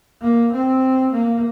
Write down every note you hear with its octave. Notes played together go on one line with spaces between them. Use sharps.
A#3
C4
A#3